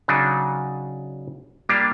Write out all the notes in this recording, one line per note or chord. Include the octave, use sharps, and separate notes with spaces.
C#3 F#3 D4 D#4
G3 A#3 D4 F4 G4